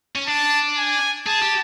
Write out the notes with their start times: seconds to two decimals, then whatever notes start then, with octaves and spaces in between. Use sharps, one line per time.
0.16 C#4
0.27 D4 A5
0.77 G#5
1.27 G#4 A5
1.42 G4